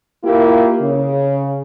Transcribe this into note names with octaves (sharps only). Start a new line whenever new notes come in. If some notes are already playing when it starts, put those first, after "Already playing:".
A#3 E4 F4 G4 A#4
C#3